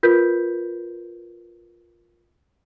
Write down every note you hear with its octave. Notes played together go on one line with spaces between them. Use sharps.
F4 A#4 B4 G6 B6